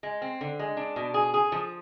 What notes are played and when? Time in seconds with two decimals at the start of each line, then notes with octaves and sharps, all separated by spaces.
0.03 G#3
0.22 C4
0.41 D3
0.59 G#3
0.77 D4
0.96 B2
1.14 G#4
1.34 G#4
1.52 F3